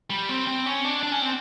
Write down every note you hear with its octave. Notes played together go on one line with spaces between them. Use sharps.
G3
C4
C4
C#4
D4
D4
C#4
C4